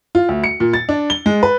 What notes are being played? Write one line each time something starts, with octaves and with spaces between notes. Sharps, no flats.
F4
D2
C#7
A#2
A6
D4
G7
G#3
B4